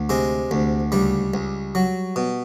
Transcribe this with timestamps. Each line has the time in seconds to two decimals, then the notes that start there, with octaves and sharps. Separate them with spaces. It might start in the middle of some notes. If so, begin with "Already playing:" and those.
Already playing: D2
0.09 C3 G#3
0.51 D2
0.92 C#2 G3
1.34 C#2
1.75 F#3
2.16 B2